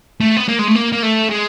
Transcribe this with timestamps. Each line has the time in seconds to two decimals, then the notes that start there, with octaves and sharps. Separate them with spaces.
0.21 A3
0.37 B3
0.48 A#3
0.59 G#3
0.67 A3
0.75 A#3
0.92 A#3
1.03 A3
1.30 G#3